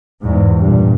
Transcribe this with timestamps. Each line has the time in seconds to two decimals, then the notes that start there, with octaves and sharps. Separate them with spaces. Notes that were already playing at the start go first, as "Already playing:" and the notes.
0.22 E2 G#2
0.59 G2 A#2